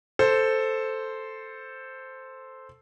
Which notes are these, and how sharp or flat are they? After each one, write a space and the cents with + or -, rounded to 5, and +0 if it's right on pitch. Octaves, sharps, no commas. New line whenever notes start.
A4 +0 C5 +0